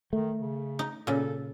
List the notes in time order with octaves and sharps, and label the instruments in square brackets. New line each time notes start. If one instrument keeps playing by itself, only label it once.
[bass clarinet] D#3 [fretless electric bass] A3
[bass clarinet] C#3
[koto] D#4
[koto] A#2 C#3 [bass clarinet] A4